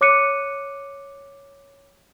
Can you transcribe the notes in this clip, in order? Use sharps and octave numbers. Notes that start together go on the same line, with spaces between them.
C#5 D6 F#6 C#7 D#7